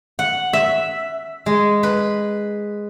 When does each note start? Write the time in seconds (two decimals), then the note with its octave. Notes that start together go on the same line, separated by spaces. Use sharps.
0.19 F#5
0.53 E5
1.46 G#3
1.83 B4